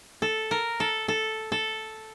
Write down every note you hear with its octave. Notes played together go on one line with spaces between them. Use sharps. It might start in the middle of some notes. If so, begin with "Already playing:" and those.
A4
A#4
A4
A4
A4